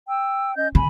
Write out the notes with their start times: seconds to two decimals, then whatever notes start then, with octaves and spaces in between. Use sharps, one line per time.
0.09 G5 E6
0.56 C#4 D#5 G6
0.75 D3 G#5 B5